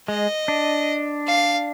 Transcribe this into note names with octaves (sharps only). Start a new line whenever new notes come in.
G#3 D#5
D4
F5